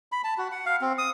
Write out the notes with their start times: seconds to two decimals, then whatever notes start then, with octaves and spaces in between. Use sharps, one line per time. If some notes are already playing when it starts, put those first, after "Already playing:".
0.12 B5
0.24 A5
0.38 F#4
0.52 F#5
0.66 F5
0.81 C4
0.98 D#6